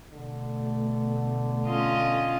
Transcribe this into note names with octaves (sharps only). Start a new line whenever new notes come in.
B2 D3 A3
C#4 F4 D#5